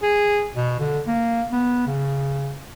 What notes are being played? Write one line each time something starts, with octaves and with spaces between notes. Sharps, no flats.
G#4
B2
D3
A#3
B3
C#3